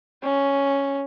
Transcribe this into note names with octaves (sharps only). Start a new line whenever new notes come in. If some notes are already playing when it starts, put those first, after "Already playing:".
C#4